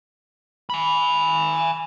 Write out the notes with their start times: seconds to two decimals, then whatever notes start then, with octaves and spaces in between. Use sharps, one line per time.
0.70 G#5 B5